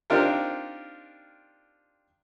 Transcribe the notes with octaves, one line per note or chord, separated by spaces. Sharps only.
C4 D4 D#4 F4 G4 A#4